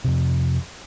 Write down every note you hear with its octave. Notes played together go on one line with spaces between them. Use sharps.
F2 C3